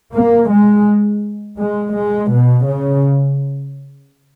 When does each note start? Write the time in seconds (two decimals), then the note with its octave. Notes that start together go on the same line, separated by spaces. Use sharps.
0.14 A#3
0.51 G#3
1.59 G#3
1.96 G#3
2.33 B2
2.68 C#3